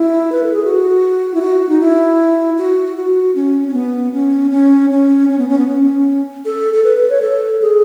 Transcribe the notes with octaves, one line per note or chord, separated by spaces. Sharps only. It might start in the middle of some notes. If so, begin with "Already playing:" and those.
Already playing: E4
B4
A4
G#4
F#4
E4
F#4
D#4
E4
F#4
F#4
C#4
C#4
B3
C#4
C#4
C#4
C#4
B3
C#4
B3
C#4
A4
A4
B4
B4
C#5
A4
G#4